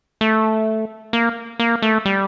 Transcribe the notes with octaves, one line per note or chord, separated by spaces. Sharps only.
A3
A#3
A#3
A3
G3